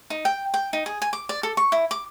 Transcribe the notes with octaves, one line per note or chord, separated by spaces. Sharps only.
D#4
G5
G5
D#4
G#4
G#5
D6
D5
A4
C#6
E4
D6